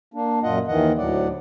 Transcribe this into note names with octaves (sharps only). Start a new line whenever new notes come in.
A#3 D4
F#2 A#2 F4 D#5 F#5
D#2 D#3 E3 D#5 F#5
D2 A2 F#3 D5 F#5